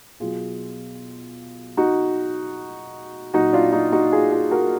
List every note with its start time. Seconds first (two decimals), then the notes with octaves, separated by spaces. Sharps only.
0.20 B2 F#3 F4 G#4
1.77 D#4 F#4
3.34 A#2 F#3 D#4 F#4
3.53 D4 F4
3.72 D#4 F#4
3.92 D#4 F#4
4.12 F4 G#4
4.31 F4 G#4
4.51 F#4 A#4